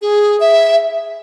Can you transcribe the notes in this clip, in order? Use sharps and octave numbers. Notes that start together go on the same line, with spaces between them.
G#4
E5